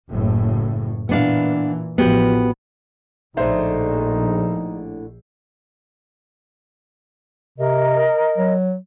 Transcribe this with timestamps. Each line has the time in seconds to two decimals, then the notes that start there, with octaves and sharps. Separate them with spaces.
0.10 F#1 A2
1.09 A#2 E3 B3 D4 F5
1.98 A1 F3 B3 F#4 G4
3.37 A#1 A2 D3 G#3 D#4 C5 E5
7.58 C3 A#4 D#5
8.38 F#3